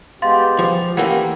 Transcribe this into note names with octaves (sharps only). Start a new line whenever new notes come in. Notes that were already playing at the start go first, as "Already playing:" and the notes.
G#3 B3 G4 F5 C6 A6
F3
E3 A3 A#3 C#4 G4 A#4 F#5